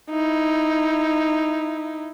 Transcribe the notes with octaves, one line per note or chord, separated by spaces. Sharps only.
D#4 E4